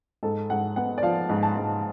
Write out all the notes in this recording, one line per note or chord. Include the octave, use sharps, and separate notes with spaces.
G#2 A4
G#2 F#5
B3 F#5
D5
F3 F5
G#2
A5
G#2